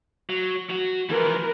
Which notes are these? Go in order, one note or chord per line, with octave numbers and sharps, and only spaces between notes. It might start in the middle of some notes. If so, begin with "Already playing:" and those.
F#3
F#3 F#4
E3 F3 A#4 B4